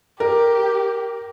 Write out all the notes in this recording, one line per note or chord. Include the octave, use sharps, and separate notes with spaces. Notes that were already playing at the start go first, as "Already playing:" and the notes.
G4 A#4